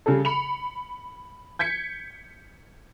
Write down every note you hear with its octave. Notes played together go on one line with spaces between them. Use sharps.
C#3 G3 G#4 A4
B5 C#7 F7
G6 G#6 B6 C#7